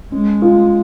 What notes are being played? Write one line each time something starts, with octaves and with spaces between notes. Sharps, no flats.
G#3 C#4
F4